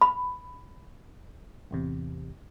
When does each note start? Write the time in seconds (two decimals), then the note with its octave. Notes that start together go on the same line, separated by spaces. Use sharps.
0.01 B5
1.71 A1 E2 C3